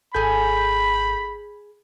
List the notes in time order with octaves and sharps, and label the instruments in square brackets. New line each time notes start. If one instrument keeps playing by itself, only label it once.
[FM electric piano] G#1 A4 G6 [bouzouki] G#4 G#5 [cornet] B5